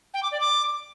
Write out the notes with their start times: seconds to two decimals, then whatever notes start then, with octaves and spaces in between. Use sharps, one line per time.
0.14 G5
0.23 D6
0.32 D5
0.41 D6